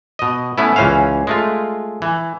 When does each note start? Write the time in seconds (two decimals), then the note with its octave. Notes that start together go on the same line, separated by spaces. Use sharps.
0.19 B2 D#5
0.58 A3 B3 C#4 E4
0.76 C#2 E3 C#4 C5 F5
1.27 G#3 A3 F4
2.02 E3